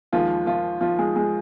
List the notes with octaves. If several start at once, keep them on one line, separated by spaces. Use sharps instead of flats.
D#2 D#3 F3 G#3 F4
F3 F4
F3 F4
G#3 G#4
G#3 G#4